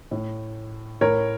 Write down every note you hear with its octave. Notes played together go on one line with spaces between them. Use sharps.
A2
A2 A#4 C#5